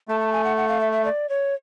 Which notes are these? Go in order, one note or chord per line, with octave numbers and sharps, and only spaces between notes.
A3 A5
A5
G#5
F#5
F#5
F5
E5
E5
D5
C#5